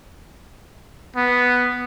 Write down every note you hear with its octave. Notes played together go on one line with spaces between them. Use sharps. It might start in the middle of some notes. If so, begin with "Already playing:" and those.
B3